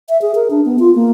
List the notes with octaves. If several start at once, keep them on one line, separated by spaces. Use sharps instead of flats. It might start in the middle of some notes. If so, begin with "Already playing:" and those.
E5
G#4
A#4
D4
B3
F4
A#3